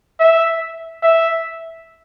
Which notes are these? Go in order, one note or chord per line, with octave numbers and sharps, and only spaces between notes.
E5
E5